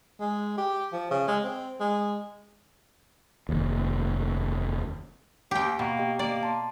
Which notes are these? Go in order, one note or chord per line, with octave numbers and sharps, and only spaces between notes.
G#3
G4
F3
C#3
G#3
C4
G#3
F1 D#2
D#2 G4 G5
B2 A#3 G5 C#6
G4 D#5 G5
A#3 D5
A5 C6